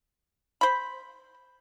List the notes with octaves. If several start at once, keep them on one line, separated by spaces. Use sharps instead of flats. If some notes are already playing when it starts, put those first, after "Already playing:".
C5 B5